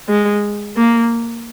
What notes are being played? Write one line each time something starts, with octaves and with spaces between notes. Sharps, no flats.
G#3
A#3